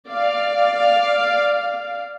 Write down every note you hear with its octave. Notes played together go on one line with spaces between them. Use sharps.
D5 F5